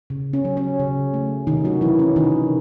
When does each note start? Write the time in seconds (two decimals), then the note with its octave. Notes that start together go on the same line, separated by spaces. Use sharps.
0.10 C#3
0.33 C#4
0.45 F#3
0.57 C#4
0.79 C#3
1.14 A3
1.47 C3 D#3 D#4
1.65 F#3 F#4
1.81 E3 F#3 E4
1.99 C#4
2.16 C3 D#3 D#4